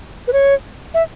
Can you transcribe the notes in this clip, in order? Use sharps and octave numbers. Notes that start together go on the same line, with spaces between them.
B4
C#5
E5